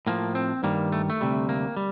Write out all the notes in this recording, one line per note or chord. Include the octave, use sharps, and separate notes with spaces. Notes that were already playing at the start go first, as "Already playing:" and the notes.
A2 F3 A#3
C4
G2 D#3 G3 A#3
A3
A3
D2 C3 G3
A#3
G3